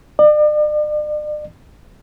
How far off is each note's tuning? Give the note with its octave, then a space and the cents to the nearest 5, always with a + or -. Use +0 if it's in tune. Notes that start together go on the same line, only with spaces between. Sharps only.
D5 +40